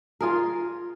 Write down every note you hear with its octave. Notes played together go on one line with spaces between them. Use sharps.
F4 G#4 A#4